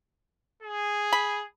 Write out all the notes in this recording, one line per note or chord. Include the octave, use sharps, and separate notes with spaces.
G#4
B5